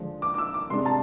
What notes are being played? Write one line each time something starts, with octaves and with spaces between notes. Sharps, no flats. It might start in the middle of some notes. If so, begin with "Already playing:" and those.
Already playing: D3 F3 G#3 D4
D6
D6
E6
D6
C3 G#3 D4 C6
A5